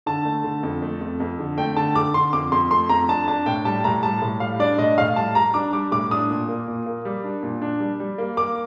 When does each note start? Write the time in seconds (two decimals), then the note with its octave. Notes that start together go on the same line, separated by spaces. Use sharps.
0.06 D3 A5
0.25 A3
0.44 D3
0.63 F2
0.82 A3
1.01 F2
1.20 F2
1.39 D3
1.58 A3 G5
1.76 D3 A5
1.95 D3 D6
2.14 D3 C6
2.33 F2 D6
2.52 F2 C6
2.71 A3 C6
2.89 F2 A#5
3.08 D4 A5
3.28 D4 A5
3.46 A2 G5
3.65 G3 A5
3.84 A2 A#5
4.03 G3 A5
4.22 A2
4.40 G3 F5
4.59 D4 D5
4.78 A2 D#5
4.98 A2 F5
5.16 G3 A5
5.35 G3 A#5
5.54 D4 D6
5.73 G3 D6
5.92 A2 D6
6.11 D4 D#6
6.30 A#2
6.48 A#3
6.68 A#2
6.86 A#3
7.05 G3
7.24 D4
7.43 A#2
7.62 D4
7.80 G3
8.00 G3
8.18 A#3
8.37 A#3 D6